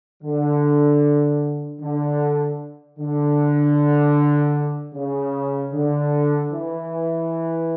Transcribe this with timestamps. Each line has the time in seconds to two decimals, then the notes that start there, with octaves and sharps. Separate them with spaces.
0.23 D3
1.80 D3
2.99 D3
4.94 C#3
5.73 D3
6.52 E3